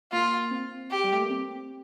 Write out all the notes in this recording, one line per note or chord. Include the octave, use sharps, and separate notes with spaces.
A#3 F4
C4
G4
G3
A3
A#3
C4